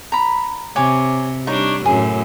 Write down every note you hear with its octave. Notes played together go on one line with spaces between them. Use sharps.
A#5 B5
C3 C#5 G#5 D6
G3 D4 D#4 C#5
F#2 A2 G#4